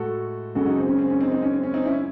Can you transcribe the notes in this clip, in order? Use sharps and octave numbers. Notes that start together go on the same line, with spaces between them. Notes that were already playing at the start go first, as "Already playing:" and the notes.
Already playing: A2 G#3 F#4 A4
F#2 C#3 G#3 F#4 A4
D#4 F#4
C4
C#4
C4
C#4
C4 D#4
C4 D#4
C#4
C4
C#4
C4 D#4
C#4 E4